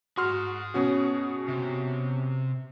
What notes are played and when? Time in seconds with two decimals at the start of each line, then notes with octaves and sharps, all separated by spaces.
0.17 F#4 G#4 A#5 C6 F6
0.74 B2 C#4 F#4
1.48 C3